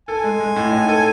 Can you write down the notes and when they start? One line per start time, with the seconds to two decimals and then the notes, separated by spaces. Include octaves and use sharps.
0.08 A4 G#5
0.24 G#3
0.40 G#3
0.56 A2
0.72 D#4
0.89 A4